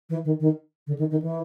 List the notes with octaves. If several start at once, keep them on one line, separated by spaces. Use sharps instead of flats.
E3
D#3
D#3
D3
D#3
D#3
E3